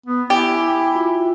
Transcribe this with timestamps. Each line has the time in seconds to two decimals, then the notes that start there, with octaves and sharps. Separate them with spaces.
0.06 B3
0.30 E4 G4 G5 G#5 D6
0.95 F4 F#4 E5